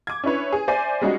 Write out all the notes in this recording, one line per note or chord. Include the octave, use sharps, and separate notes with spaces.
D6 G#6
C#4 D4 E4 B4 C#5
G#4
C5 D5 E5 G#5
G3 G#3 C#4 D#4 F#4